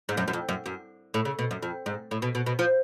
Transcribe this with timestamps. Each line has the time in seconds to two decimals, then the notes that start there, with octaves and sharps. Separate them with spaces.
0.09 G#2
0.17 F#2
0.28 F#2
0.33 F2
0.49 F#2
0.66 F#2
1.14 A2
1.25 C#3
1.39 B2
1.51 F#2
1.63 F2
1.86 G#2
2.11 A2
2.22 B2
2.35 B2
2.46 B2
2.59 F3